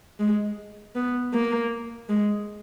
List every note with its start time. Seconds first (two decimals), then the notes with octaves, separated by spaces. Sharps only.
0.20 G#3
0.95 B3
1.34 A#3
2.09 G#3